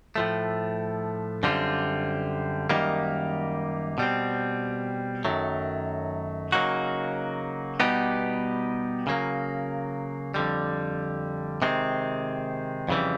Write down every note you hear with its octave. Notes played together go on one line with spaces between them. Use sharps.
A2 F3 A3
F#2 D3 G3 C4 F4
F#2 D#3 G3 A#3 D#4
B2 G3 C4
F#2 D#3 F#3 A3
C#3 F#3 A#3 D#4 F#4
B2 G3 B3 D#4 G4
C#3 F#3 A#3
F2 D3 G3
C3 D#3 G#3 C4
F2 C#3 E3 G3